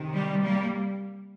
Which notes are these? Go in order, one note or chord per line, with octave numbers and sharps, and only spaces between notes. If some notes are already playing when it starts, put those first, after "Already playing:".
Already playing: C3 D#3
G3
G3 A#3